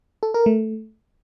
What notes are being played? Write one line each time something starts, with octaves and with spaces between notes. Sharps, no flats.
A4
A#4
A3